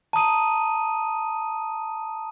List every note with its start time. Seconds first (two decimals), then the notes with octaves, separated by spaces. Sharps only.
0.13 A5 A#5 D#6 D#7